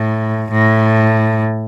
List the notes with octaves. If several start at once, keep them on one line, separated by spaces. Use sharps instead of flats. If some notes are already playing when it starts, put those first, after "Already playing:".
Already playing: A2
A2